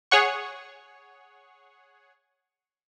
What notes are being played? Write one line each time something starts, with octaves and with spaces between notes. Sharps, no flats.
G#4 C#5 F#5 C#6